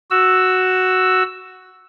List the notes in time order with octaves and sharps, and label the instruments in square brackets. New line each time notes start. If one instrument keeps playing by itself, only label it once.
[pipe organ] F#4 E6